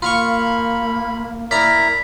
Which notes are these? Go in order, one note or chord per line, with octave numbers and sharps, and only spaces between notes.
A#3 F4 F5 B5 C#6
E4 A#4 D5 E5 A#5 B6